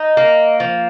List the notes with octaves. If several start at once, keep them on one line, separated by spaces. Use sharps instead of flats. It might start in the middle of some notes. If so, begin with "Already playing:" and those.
Already playing: D#4
A#3
F3